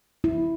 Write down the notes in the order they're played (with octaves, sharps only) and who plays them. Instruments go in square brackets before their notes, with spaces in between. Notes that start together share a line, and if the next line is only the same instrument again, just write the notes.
[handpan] E4